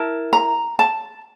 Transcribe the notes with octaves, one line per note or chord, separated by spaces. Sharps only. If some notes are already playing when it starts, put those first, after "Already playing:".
Already playing: E4 A#4 A5
A#5
A5